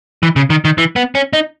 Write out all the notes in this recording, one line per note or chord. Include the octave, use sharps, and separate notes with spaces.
E3
C#3
D#3
D#3
E3
B3
C#4
D#4